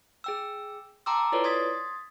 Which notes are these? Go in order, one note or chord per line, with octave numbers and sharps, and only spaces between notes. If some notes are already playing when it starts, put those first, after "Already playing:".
G#4 G5 E6
G5 A5 A#5 C6 D6 E6
E4 F4 A4 B4 C#5 D5
C6 D#6 G#6 A6 B6